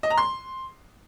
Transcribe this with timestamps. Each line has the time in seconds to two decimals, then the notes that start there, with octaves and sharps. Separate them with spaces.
0.03 D#5
0.10 A#5
0.18 C6